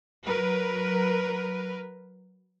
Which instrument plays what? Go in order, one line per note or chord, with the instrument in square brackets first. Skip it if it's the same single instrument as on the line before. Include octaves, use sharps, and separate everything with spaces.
[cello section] F#3 A#4 B4